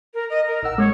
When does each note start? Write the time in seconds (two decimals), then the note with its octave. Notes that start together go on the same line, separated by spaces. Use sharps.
0.13 A#4
0.29 D#5
0.46 A#4
0.63 A1 F#5 E6
0.78 G#3 C#5